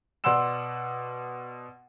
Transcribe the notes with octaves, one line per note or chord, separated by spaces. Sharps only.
B2 D5 F#5 C6 E6 E7